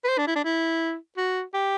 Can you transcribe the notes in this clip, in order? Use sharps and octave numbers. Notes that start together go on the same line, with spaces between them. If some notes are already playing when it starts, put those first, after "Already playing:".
B4
C5
D4
E4
D4
E4
F#4
G4